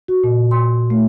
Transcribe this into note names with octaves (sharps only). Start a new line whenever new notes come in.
F#4
A#2
C6
A3